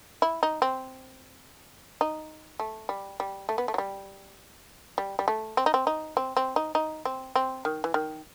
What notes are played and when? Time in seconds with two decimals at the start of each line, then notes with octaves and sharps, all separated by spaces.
0.22 E4
0.43 D#4
0.62 C4
2.01 D#4
2.60 A3
2.89 G3
3.20 G3
3.49 A3
3.58 B3
3.68 A3
3.74 F#3
3.78 G3
4.98 G3
5.19 G3
5.28 A3
5.57 C4
5.66 D#4
5.74 C4
5.87 D#4
6.17 C4
6.37 C4
6.56 D#4
6.75 D#4
7.05 C4
7.36 C4
7.65 D#3
7.84 E3
7.94 D#3